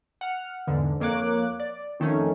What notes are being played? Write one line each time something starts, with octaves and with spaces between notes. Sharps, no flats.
F#5 F6
E2 G#2 D3
F2 A#3 C#5 D6 F#6
D5
F2 D#3 A3 C#4